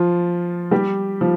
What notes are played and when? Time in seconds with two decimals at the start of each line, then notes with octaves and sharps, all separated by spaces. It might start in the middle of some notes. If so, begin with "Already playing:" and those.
Already playing: F3 F4
0.71 G3 G4
1.21 F3